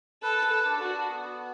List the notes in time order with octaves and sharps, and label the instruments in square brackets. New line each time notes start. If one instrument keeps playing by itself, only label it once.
[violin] A4 [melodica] B4
[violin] A4
[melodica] D4
[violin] F#4
[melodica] B3